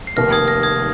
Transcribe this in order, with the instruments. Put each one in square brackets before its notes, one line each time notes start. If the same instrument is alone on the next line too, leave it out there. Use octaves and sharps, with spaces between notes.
[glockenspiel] C7
[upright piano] F1 D#2 D#3 [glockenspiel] F6 A#6
[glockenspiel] D#6 G#6
F6 A#6
D#6 G#6